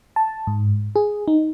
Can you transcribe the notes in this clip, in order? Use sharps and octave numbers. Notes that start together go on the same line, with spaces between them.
A5
G#2
G#4
D#4